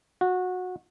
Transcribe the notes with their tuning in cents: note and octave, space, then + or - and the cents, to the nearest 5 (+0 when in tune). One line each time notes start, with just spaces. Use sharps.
F#4 -20